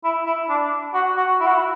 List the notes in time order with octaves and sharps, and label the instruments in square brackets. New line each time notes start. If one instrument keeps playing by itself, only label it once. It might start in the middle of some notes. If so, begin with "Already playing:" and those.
[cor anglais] E4
E4
D4
F#4
F#4
E4
F#4
E4